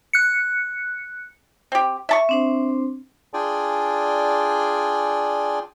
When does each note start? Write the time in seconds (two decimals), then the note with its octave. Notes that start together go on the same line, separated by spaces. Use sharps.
0.13 F#6 C#7
1.72 C4 G4
2.09 E5 A5 C#6
2.29 C4 D4 C5
3.34 D4 F4 G#4 D5 G5 G#5